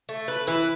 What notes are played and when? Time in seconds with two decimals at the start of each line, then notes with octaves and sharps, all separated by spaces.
0.09 A3
0.28 B4
0.47 E3 B4